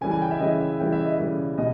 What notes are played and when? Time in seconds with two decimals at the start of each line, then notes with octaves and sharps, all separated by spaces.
0.01 C#3 E3 G3 G#5
0.11 G#5
0.22 G5
0.31 E5
0.40 C#3 E3 G3 D#5
0.61 E5
0.80 C#3 E3 G3 G5
0.93 E5
1.05 D#5
1.18 C#3 E3 G3 E5
1.58 B2 D#5